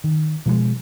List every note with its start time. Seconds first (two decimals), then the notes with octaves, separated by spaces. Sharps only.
0.04 D#3
0.46 B2 F3 F#3 G#3